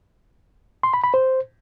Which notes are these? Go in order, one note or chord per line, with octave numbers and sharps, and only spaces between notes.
C6
B5
B5
C5